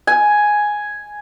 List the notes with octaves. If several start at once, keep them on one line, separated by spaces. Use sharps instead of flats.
G#5